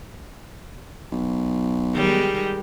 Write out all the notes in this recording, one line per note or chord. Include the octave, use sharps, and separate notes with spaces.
B1
D#3 G3 G#3